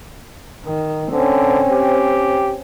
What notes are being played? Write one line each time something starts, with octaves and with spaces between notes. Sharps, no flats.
D#3
D3 C4 C#4
G4